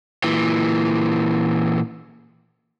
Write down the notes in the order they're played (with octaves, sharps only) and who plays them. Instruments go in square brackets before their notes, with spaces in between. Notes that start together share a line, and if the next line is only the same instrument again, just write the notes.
[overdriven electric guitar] A#2 E3